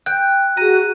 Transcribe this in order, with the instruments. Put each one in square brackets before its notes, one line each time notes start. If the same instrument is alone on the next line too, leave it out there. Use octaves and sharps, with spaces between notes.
[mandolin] G5 [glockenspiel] F#6
[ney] F#4 [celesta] G#4 D#7 [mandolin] A#5